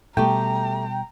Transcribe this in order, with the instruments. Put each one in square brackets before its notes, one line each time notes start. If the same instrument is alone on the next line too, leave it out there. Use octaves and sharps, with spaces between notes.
[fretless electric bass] B2 G3 [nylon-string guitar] A3 G4 [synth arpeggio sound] G5 [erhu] A#5